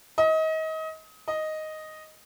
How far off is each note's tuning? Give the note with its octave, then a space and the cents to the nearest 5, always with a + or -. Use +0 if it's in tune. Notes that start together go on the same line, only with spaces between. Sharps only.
D#5 +30
D#5 +0